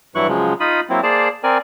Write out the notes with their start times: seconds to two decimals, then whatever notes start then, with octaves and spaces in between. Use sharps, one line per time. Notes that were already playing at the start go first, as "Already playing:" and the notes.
0.15 G2 E3 F#3 E4 C#6 F#6
0.28 C#3 F3 F#3 G#3
0.60 D#4 F4 B5 D#6
0.90 F#3 A#3 C4 E4
1.03 A#3 G#4 C5 D5 A5
1.43 C4 A#4 D5 G#5